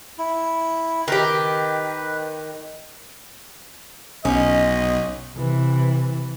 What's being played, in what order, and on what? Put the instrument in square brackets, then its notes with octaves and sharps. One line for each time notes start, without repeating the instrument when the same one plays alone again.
[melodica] E4
[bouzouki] D#3 G4 [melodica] B4
[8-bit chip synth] B1 [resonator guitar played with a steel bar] C#4 [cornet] D#5
[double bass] C3 E3